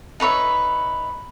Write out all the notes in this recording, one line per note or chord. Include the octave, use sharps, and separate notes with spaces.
D#4 B4 C#5 E5